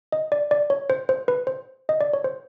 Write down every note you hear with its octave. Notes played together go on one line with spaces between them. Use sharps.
D#5
D5
D5
C#5
C5
C5
B4
C5
D#5
D5
C#5
C5